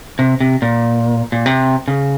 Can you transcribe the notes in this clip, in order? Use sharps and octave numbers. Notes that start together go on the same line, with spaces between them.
C3
C3
A#2
A#2
C3
C#3